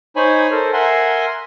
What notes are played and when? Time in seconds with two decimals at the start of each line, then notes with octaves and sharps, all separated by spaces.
0.16 D#4 C5 C#5 G#5 B5
0.51 A4 A#4 C5
0.73 A#4 E5 F#5 G#5 C6